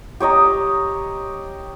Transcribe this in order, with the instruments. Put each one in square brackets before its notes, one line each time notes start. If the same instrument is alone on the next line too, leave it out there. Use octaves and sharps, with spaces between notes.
[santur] G4 C#5 D#5 A#5